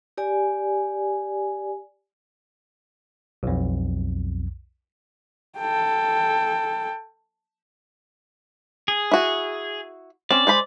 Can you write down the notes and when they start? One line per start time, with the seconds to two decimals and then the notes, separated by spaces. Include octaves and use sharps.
0.18 G4 D5 G#5
3.43 B1 F2
5.58 A4 G5
8.88 G#4
9.12 E4 F#4
10.31 C4 C#4 D5
10.47 G#3 C5 B5